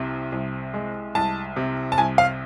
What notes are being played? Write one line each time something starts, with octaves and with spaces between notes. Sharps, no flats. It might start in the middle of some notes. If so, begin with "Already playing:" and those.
Already playing: C2 C3
C2
G#3
C2 A5
C3
A5
C2 G#5
F5